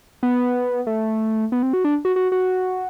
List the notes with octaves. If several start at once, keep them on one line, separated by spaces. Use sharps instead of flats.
B3
A3
B3
C4
F#4
D4
F#4
F#4
F#4